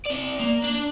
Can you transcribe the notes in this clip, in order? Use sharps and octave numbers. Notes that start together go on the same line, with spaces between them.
C4 D5
A#3
D4